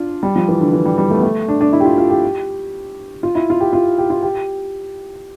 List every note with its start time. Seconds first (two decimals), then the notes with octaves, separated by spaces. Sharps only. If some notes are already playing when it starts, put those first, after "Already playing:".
Already playing: D4 F4
0.23 G3
0.36 F3
0.49 E3
0.60 D3
0.73 E3
0.85 G3
0.98 G3
1.11 A3
1.17 B3
1.22 A3
1.48 D4
1.61 D4
1.73 E4
1.80 G4
1.85 F4
1.98 F4
2.10 G4
3.23 F4
3.35 E4
3.50 F4
3.61 G4
3.73 F4
3.98 G4
4.10 F4
4.23 G4